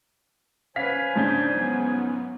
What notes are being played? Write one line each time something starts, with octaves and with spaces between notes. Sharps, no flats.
C#4 B4 C5 F5 G#5 B6
G#2 C#3 D4 A5 G6
F#3 B3